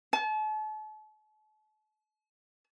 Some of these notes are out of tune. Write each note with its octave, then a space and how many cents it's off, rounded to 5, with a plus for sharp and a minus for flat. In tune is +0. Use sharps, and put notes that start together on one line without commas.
A5 -40